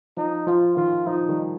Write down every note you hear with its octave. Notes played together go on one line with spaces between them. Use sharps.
F3 D#4
F3 F4
D#3 F4
F3 D#4
D#3 G3